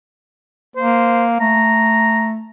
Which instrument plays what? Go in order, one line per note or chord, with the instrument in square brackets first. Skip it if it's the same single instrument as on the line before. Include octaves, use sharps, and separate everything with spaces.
[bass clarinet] A#3 [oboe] C5
[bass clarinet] A3 [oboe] A#5